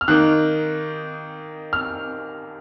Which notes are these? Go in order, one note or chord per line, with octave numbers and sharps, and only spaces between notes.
F6
D#3 A#3 D#4 F#6
F6